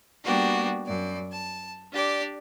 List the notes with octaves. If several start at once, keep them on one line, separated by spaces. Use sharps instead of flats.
G3 A#3 B3 D4 F#4 G4
F#2 D5
A5
D4 G4 D5